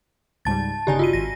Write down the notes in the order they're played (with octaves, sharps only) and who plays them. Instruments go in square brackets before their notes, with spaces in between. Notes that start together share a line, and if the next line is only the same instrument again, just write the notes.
[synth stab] C#2 G#2 G3 [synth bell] A5 A6
[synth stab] G1 C#3 D#4 [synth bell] G4 D5 G#5
[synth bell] F4 F#4 D#7
[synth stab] G#1 [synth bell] A#6